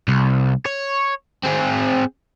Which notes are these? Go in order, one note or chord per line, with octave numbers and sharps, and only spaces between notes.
C2
C#5
C4 G#4